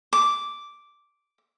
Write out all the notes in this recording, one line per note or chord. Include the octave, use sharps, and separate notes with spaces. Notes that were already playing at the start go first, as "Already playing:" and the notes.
D6